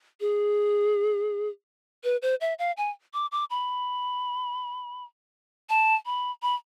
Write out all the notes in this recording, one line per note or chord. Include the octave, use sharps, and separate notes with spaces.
G#4
B4
C5
E5
F5
G#5
D6
D6
B5
A5
B5
B5